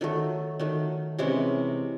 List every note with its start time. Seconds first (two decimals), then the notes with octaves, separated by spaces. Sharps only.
0.01 D#3 F#3 A3
0.59 D#3 F#3 A3
1.19 C3 E3 G#3 C#4 E4